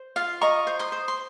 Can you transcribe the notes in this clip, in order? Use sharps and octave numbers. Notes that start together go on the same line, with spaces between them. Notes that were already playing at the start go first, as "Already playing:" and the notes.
Already playing: C5
F4 F5
D#5 A#5 C#6
C5
C6 D#6
C5
C6